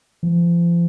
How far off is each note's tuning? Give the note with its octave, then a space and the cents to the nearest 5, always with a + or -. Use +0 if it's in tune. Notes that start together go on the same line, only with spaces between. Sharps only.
F3 -35